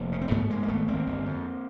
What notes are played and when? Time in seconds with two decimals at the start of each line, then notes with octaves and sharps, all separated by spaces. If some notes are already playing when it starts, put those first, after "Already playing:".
Already playing: F1 A#3
0.12 C#3
0.21 C4
0.31 G#2 A3 B3
0.50 G#2 G#3 A#3
0.63 A#3
0.68 G#1 A3 B3
0.88 G#1 A#3 C4
1.07 G1
1.26 F2